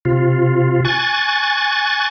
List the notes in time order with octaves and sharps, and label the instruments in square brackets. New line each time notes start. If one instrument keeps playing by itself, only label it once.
[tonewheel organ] C3 F4
G#5 C#6 F#6 A6